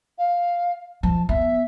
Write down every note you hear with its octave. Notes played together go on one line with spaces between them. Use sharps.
F5
F3 A5
B3 E5